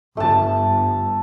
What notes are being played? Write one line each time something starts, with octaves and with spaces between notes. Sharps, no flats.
G1 A3 A5